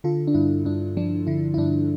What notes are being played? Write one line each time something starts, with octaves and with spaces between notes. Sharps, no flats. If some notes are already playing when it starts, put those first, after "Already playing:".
D3 F4 A4
D4
G2 E4
G2 D4
F3 D4
D3 E4
E4
G2 D4